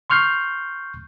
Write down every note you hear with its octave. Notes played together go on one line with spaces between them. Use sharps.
C6 C#6 F6 G6 C7